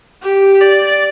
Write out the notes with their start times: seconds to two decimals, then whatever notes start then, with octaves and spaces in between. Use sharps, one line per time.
0.23 G4
0.61 D5